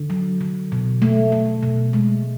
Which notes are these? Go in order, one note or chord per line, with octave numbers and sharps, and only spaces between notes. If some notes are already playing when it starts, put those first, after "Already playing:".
Already playing: D3
F#3
D3
B2
A3
A3
B2
G#3